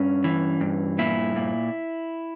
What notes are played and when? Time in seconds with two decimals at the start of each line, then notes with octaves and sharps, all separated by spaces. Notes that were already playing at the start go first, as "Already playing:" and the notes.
Already playing: G2 C#4
0.24 E3
0.61 G2
0.98 A#2 E4
1.36 A#2